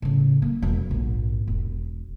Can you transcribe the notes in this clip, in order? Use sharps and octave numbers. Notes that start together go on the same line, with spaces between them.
A2 C#3
A#3
E1 F3
A#1 G#2
E1